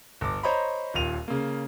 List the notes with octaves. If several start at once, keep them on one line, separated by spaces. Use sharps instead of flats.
G1 D6
C5 C#5 D#5 A#5 B5
D#1 D#2 A#2 D#7 F7
C#3 A#3